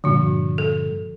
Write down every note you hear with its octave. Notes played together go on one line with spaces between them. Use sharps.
G2 A#2 D3 F3 F#4
A4